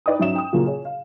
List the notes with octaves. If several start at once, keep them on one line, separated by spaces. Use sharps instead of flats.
D#4 B4 D5 D#5 G5 D#6
G#2 F#3 C#4 E5 D#6 E7
G5 D#6
A#2 C#3 F#3 A#3 F4
G#4 C#5
F5